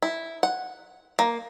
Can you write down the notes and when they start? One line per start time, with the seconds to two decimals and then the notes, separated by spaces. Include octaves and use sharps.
0.02 E4
0.43 F#5
1.19 A#3